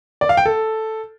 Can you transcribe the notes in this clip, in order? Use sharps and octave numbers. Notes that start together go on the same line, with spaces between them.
D5
F5
G5
A4